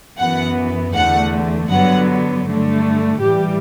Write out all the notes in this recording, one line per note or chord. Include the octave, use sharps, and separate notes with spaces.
F#2 E3 B3 F#5
E2 D3 A3 F#5
G2 D3 F#3 B3 F#5
G2 D3 A3
A2 E3 G3 G4